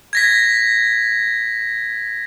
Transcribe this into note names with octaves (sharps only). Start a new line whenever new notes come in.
G#6 A#6 B6